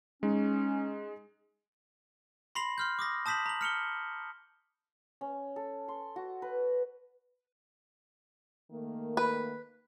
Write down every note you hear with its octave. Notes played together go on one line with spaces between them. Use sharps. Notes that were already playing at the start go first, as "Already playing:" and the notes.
G#3 C#4 D#4
B5 C6 A#6 C7 F7 F#7
C6 F6 G6
D6 D#6 A#6
A5 D#6 G6 B6 E7 F#7
A#5 F#7
F6 C#7 F7 G7
C#4
A4
C6
F#4
B4
D#3 A3 A#3
B4